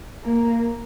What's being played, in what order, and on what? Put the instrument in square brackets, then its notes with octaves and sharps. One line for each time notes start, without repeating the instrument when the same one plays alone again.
[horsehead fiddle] A#3